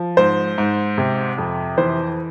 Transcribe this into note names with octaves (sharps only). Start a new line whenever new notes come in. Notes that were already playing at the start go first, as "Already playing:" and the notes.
Already playing: F3
G#2 C5
G#2
C3
F2
E3 C5